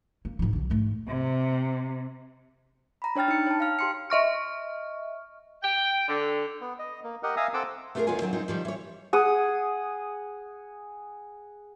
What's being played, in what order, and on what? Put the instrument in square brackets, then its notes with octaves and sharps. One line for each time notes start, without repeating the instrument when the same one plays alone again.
[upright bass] A#3
G#2 F3
B1 D3
G#2 A3
[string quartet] C3
[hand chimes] A#5 B5
D4 C#5 G5 F6 A6
D#4 C#7
C#5 A5
F5 F6
G4 C6 C#7
[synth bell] D#5 E5 C#6 F6
[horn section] G5
D3
[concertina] B3
D#5
A#3
G4 A#4 D#5 F#5
E5 F5 G#5 A#5 D#6
C4 A4 F#5 D6 E6
[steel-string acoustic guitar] A3 B3 F4 G4 G#4 A#4
D2 D#3 B3 F4 C#5 G#5
D#3 F#3 C4 F4
F#2 G#3 C4 D#4 F4
D#3 F3 G3
E3 C#5
[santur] G#4 F#5 D#6